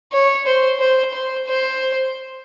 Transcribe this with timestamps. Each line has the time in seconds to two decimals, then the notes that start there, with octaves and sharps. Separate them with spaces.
0.12 C#5
0.46 C5
0.80 C5
1.13 C5
1.47 C5